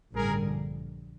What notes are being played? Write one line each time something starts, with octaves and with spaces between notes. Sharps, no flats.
A1 G2 D3 G3 G#4 A#4
A#1